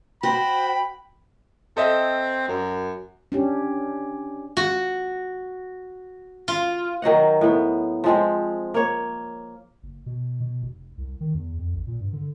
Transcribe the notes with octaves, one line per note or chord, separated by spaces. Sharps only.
F#4 C5 G5 B5
C4 A4 D#5 E5
F#2
C#4 D4 G4
F#4
F4
D#3 F#3 D#5 F#5
A2 B3
F3 G#3 C4
A#3 C#5
F#1
B2
B2
F1
C2
D#3
E2
F2
A1
A#2
G2
D3